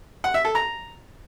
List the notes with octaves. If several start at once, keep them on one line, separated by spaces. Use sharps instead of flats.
F#5
E5
A4
A#5